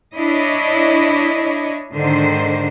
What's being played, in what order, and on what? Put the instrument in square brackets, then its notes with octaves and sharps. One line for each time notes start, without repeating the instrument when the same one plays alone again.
[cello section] D4 E4 C#5 D#5
G#2 D3 D#3 C5